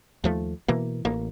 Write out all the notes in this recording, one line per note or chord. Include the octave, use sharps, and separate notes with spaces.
D#2 F3 A3
B2 E3 A#3
A1 A#3